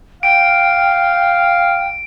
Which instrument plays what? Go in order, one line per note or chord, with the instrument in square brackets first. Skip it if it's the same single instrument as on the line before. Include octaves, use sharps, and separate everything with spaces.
[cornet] F5 [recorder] G5 [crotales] D7